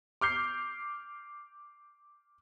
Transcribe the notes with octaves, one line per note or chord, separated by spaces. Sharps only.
D6 F6 G6 C7